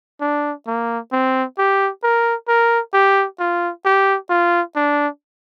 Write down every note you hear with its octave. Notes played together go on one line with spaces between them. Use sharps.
D4
A#3
C4
G4
A#4
A#4
G4
F4
G4
F4
D4